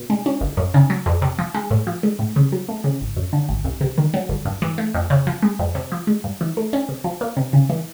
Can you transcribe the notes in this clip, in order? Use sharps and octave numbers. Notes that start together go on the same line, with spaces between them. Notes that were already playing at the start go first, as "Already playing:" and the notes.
Already playing: B2
G#3
C#4
G1
F#2
C#3
F#3
F2
C3
F3
G#3
A2
F3
G#3
A2
C#3
F#3
A3
C#3
G#1
F#2
D3
G#1
C2
C3
D#3
F#3
G1
G2
E3
A3
F2
C#3
F3
G#3
F2
C3
F3
G#3
G2
E3
A3
C#4
C3
F3
A#3
C3
C#3
E3